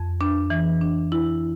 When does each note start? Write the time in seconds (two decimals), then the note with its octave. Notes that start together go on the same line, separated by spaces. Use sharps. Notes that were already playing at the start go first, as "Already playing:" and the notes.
Already playing: F2
0.21 D4
0.50 E3
0.81 D4
1.12 E4